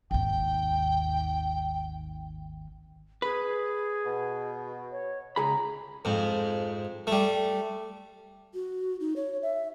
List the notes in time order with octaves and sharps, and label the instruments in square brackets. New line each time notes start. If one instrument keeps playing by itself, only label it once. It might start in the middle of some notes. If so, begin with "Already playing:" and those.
[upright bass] G#1 D#2 [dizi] G5
[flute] G#4 [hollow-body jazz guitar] B4
[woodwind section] B2
[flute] C#5
[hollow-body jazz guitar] C#2 G#4 B5 [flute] A#5
[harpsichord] F2 G#2
G3 A3
[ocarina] F#4
D#4
C#5
E5